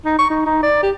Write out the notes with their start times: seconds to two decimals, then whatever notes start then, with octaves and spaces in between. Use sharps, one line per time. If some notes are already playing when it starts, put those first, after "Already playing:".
0.05 D#4
0.19 C#6
0.30 D#4
0.46 D#4
0.63 D5
0.83 G4